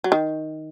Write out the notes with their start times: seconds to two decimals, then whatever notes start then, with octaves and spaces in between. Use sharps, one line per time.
0.04 F#3
0.12 D#3